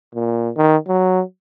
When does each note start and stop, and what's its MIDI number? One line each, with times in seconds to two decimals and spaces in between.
0.14 0.50 46
0.57 0.76 51
0.88 1.21 54